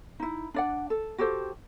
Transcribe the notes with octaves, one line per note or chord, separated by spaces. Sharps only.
D#4 E4
D4 D5 F#5
A4
F#4 G4 A4 C5